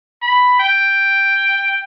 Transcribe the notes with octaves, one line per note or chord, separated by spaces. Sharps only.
B5
G5